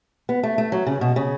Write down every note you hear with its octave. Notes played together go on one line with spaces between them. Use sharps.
B3
A3
A3
F#3
C#3
B2
C#3